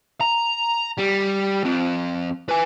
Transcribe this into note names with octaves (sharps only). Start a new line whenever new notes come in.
A#5
G3
F3 C4
B4 G#5